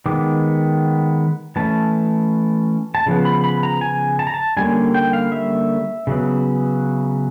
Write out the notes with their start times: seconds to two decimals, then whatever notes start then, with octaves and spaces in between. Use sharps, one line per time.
0.06 D#3 G#3 B3 D6
1.56 E3 A3 C#4 A5
2.95 A5
3.06 C#3 F3 B3
3.25 B5
3.44 B5
3.63 A#5
3.81 G#5
4.19 A5
4.27 A#5
4.34 A5
4.57 D3 G3 A#3 C#4 G#5
4.94 G5
5.13 F5
5.32 E5
6.07 C#3 F#3 B3